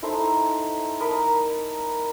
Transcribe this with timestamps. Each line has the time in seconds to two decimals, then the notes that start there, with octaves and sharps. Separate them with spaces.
0.02 D#4 E4 A4 C5
1.00 A#4 D#5 A5 B5